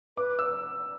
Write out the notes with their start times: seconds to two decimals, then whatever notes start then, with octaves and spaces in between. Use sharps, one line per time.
0.17 B4 D6
0.39 E6